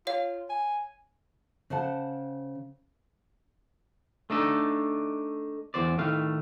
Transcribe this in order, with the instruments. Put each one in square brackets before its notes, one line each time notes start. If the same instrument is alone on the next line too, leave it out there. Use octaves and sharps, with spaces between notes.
[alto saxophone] F4 [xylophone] C#5 F5
[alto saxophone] G#5
[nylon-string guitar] C#3 C5 F#5 A5
[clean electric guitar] A3 D4 D#4 A4
E2 C5 D5
A2 D#3 A3 F5